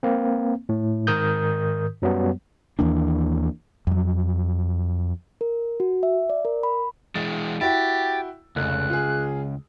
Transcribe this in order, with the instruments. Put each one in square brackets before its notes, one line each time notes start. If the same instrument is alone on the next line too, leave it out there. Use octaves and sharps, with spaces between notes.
[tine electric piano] A#3 C4
A2
G#2 D#3 A#4 D#6 G6
F#2 F#3 G3 B3
[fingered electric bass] D#2 E3 A#3 D4
F2 F#3
[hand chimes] A#4
F#4
E5
D5
A#4
B5
[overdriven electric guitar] E3 G#3 [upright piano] A6
[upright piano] E4 F#4 G5 [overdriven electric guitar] G4 [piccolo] A6
[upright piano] F1 [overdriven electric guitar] C#2 [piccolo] F#6
[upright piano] F4 G#4